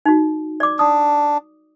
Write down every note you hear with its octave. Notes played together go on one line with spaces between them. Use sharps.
D#4 F#4
D5 D6
D4 D#6